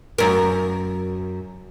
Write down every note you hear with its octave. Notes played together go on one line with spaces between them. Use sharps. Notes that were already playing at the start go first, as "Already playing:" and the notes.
F#2 A#4